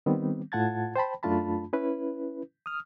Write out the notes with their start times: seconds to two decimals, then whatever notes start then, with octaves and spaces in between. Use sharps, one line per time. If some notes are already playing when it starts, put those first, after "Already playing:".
0.06 D#3 G3 B3 C4
0.52 A2 F4 F#5 A5 G#6 A6
0.96 C5 G5 A5 B5
1.23 F#2 A3 D4 F4 A5 B5
1.73 C#4 E4 B4
2.66 D#6 F6